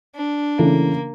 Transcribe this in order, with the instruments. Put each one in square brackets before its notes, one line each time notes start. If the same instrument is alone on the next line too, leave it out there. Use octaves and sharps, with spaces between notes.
[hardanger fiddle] D4
[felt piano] C#3 E3 A3 [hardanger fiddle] A#3